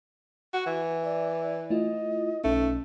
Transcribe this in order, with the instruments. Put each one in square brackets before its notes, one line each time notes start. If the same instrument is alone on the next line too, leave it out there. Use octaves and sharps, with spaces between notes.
[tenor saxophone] F#4
E3
[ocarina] D5 [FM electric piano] E5
[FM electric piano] A3 E4 F4 [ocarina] D#5
[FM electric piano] B1 C#4 D#4 [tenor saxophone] A3